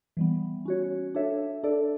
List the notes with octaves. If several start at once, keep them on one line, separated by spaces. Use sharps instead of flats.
E3 G3 B3
C#4 F#4 C#5
D4 A4 C#5 E5
D4 A4 D5